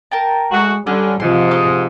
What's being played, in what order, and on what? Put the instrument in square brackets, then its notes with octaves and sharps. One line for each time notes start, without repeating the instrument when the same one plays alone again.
[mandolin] A#4 G5 A5
[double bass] G#3 [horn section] A3 F#4
[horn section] D3 [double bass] G3 [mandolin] C#4
[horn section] G#2 [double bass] C3 F3 [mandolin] C6
[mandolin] D#4 D#5 C6